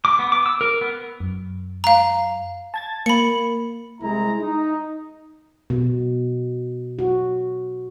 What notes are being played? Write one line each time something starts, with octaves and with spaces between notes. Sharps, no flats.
D6
B3
D6
E6
A#4
B3
F#2
F5 A#5
A5 G#6 A6
A#3 B5 C#7
C2 G#3 E4 A#5
D#4
B2
F#4